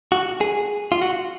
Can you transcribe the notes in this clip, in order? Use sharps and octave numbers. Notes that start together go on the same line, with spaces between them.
F#4
G#4
F4
F#4